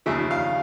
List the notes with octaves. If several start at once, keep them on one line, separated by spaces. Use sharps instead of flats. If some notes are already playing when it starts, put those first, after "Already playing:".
D#2 C#3 F3 E5
F5